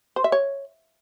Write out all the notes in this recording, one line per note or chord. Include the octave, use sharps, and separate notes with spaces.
C5
E5
C#5